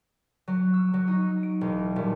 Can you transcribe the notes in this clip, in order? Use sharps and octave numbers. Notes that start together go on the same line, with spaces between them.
F#3
E6
F#3
D#4
D7
E1
D#1